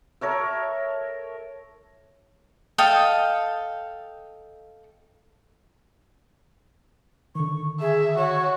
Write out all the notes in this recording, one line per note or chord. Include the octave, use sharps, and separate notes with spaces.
A4 A#4 C#5 E5
A4 D#5 F5 G5
D3 D#3 C#6
G#4 E5
F#4 C#5